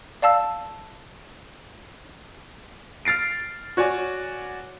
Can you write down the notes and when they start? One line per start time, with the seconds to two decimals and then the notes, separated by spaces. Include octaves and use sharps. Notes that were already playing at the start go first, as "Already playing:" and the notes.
0.22 D5 F5 A5 E6
3.05 F6 A6 C7 D7
3.77 F#4 C#5 D5 G#5